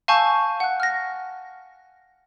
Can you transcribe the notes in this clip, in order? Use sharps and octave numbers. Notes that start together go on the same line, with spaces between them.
F5 G#5 A5 C#6 E6 G6
F#5 F#6
F6 A#6